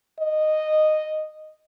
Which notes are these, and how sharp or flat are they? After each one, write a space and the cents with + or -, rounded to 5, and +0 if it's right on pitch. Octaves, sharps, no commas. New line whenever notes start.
D#5 -10